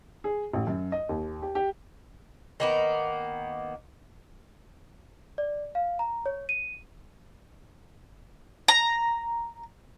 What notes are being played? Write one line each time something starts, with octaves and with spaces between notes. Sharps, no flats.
G#4
A1
F#2
D#5
D#2
G4
G4
D#3 A#3 B3
D5
F5
A#5
C#5
D#7
A#5